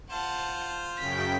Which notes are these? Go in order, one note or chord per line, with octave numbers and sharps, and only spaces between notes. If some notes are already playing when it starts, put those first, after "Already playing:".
F4 C5 F#5 A5
F#2 C#3 G5 B6